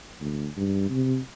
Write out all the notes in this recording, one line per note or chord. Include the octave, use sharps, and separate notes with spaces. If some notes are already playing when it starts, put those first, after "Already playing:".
D2
G2
C3